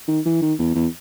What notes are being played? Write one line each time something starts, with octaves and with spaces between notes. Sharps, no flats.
D#3
E3
D#3
E2
E2